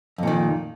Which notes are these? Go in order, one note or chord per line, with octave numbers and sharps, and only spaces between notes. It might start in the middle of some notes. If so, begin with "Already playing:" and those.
F2 A#2 D#3